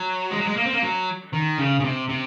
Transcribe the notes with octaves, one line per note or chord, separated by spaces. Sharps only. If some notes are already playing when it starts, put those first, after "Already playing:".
Already playing: F#3
G#3
F#3
G#3
A#3
C4
A#3
F#3
D#3
C#3
C#3
C3
C3